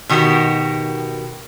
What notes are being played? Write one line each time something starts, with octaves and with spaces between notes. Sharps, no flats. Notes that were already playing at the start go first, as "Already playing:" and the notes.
B2 D#3 F#4 G4 A#4